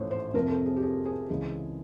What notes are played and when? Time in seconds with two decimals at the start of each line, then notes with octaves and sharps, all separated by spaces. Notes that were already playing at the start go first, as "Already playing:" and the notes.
Already playing: A1 G#2 F3 A3 C5 C#5
0.11 C5
0.34 F2 C3 F3 A#4
0.50 A4
0.66 G#4
0.76 G4
0.82 G#4
1.05 G#4
1.29 C#2 C#3 E3 G#3 G#4